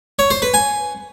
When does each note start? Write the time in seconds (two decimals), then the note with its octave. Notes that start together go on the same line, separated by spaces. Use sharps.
0.19 C#5
0.30 C5
0.42 B4
0.54 G#5